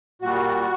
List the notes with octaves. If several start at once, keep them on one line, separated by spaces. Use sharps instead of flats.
A#2 G3 F#4